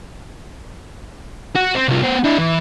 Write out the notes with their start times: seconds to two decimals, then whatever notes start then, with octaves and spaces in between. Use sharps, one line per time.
1.56 F#4
1.75 C4
1.88 C2 F4
2.03 B3 C5
2.24 D4 E4
2.38 E3